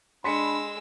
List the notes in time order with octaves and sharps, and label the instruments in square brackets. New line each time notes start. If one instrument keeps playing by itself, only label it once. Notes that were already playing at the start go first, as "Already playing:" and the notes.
[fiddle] G#3 E6 [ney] D4 [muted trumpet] B5 [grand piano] C6 B6 C#7